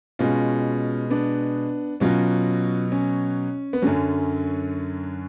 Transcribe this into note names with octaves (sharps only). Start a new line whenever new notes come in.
B2 G#3 C#4 F4
B3 D4
B2 F#3 C#4 F4
C#4
B3
F#2 D3 F#3 C#4